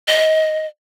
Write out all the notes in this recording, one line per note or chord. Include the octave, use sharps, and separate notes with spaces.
D#5